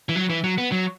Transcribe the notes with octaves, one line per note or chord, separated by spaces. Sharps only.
E3
F#3
E3
F#3
B3
F#3